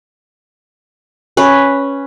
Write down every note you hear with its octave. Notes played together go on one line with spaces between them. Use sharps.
C#4 B4